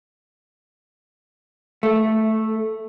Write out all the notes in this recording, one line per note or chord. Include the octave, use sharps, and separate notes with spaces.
A3